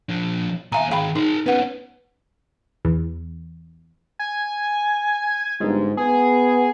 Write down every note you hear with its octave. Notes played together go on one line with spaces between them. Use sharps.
F3 D4
D#2 E5 F5 G#5 A#5
D#3 G#4 F5 G5 B5
D#4 G#4 A#4
B3 C#4 B4 F#5
E2
G#5
G1 G#2
B3 G#4